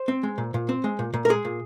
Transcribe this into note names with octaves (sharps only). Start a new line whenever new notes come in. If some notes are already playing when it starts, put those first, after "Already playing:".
Already playing: C5
C4
G#3
A#2
A#2
C4
G#3
A#2
A#2
A#4
G#3 G#4
A#2